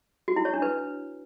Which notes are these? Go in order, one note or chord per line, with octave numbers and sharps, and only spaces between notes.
F#4
E4
C#5
D4
B4